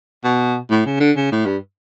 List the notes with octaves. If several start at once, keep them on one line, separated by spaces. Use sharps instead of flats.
B2
A2
C#3
D3
C#3
A2
G2